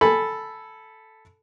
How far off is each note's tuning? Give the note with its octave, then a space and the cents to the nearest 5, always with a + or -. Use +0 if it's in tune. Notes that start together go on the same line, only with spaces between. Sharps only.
A4 +0 G#5 +0 B5 +0